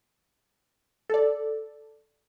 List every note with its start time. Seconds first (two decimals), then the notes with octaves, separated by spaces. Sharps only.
1.10 A4 D5